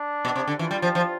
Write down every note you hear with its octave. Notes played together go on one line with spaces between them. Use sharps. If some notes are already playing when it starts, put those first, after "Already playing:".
Already playing: D4
B2
C3
D3
E3 F4
G3
F3
F3